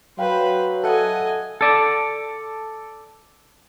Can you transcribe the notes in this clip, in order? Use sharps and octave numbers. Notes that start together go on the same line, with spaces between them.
F#3 B4 C5 F5 G5
A4 D#5 E5 F#5 G#5
A4 D5